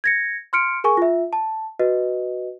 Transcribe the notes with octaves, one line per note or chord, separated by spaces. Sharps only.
G#6 A#6 C#7
C6 F6 C#7 D7
G#4 A#4 G#5 C#6
F4 E5
A5
F#4 B4 D#5